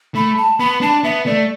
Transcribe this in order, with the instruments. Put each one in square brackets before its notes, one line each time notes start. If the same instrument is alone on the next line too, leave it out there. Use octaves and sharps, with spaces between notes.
[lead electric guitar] A3 [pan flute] B5
[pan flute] A5
[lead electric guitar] B3 [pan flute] B5
[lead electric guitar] D4 [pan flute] A5
[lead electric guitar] B3 [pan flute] E5
[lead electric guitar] A3 [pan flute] D5